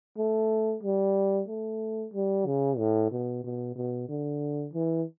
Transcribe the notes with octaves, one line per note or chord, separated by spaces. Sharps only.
A3
G3
A3
G3
C#3
A2
B2
B2
B2
D3
E3